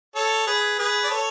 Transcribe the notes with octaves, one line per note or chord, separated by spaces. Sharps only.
A4 C#5
G#4 B4
G#4 B4
D5
A4 C#5